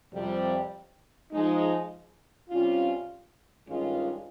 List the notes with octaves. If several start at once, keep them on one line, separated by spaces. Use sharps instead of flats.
F2 C3 G3
F3 G#3 D#4
C3 G3 C#4 F4
G2 D#3 G#3 C#4 F4